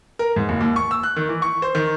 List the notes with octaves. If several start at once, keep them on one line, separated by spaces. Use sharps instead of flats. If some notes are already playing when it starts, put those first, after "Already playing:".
A#4
G#2
F#1
D#2
C#6
E6
F#6
D#3
E3
C#6
C5
D#3